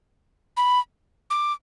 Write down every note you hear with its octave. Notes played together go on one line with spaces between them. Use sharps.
B5
D6